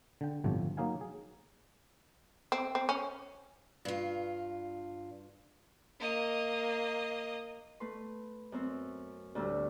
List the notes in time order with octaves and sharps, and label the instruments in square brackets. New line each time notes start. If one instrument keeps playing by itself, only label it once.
[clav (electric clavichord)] D3 G5
G1 A2 C3 F3
F#3 A#3 D#4 F5 G#5
G#4
[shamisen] C4
C4
C#4
[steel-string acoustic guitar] G2 F4
[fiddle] A#3 D#5
[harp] A3 B4 C6
F#2 C4
D2 A2 G3 E6